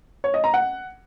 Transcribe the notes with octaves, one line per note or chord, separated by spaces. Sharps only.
C#5
D#5
A#5
F#5